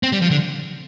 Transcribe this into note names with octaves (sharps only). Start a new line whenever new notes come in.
C4
G3
F3
D3